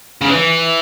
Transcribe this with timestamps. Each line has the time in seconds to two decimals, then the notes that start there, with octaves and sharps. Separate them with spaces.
0.21 C#3
0.29 E3